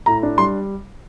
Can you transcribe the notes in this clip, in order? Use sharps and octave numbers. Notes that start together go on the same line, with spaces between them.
A2 A#5
D4
G3 C6